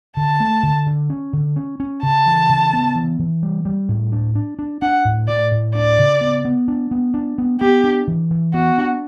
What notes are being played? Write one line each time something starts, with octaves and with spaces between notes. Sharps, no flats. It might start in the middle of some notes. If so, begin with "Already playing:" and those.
D3 A5
A3
D3
D3
C#4
D3
C#4
C#4
C#3 A5
E3
C#3
B3
E3
E3
G3
G3
A2
D4
D4
D4
D4 F#5
A2
A2 D5
A2
D4 D5
C#3
B3
B3
D4
B3
D4
B3
B3 G4
D4
E3
E3
B3 F#4
D4